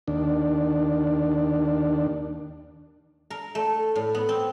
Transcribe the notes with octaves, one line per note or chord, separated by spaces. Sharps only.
D#2 D4
A#4
A3
A2
B3
C4